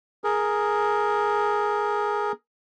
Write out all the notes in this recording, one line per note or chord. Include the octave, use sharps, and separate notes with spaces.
G#4 A#4